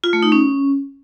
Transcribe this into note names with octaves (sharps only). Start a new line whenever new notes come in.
F4
A3
D#4
C#4